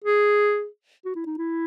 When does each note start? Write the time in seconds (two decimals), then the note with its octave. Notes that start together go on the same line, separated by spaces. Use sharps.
0.04 G#4
1.05 F#4
1.15 E4
1.26 D#4
1.38 E4